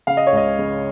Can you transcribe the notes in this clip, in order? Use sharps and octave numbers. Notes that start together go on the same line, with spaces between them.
C#3 F5
D#5
C#5
C#2 D#5
C#3